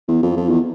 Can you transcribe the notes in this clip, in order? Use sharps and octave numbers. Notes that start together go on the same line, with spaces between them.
E2
F2
F2
E2